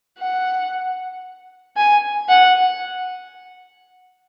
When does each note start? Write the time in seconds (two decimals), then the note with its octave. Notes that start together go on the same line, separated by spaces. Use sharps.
0.19 F#5
1.77 G#5
2.29 F#5